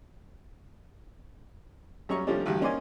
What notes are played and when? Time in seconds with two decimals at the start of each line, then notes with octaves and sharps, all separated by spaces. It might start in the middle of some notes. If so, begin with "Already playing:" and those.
2.09 F#2 G3 C#4 A#5 C#6
2.27 C3 F3 G3 A3 C#4 D4
2.46 A1 D2 G2 F#4 G4
2.61 A#3 C#4 D#4 C5 D5 G#5